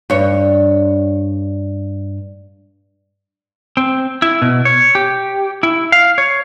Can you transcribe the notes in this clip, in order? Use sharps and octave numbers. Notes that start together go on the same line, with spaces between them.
G2 C#5
C4
E4
B2
C#5
G4
E4
F5
C#5